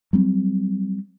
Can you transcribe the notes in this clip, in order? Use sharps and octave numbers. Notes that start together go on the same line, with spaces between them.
F#3 G3 C4